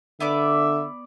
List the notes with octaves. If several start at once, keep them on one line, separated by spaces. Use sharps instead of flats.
D3 B3 D5 E5 D6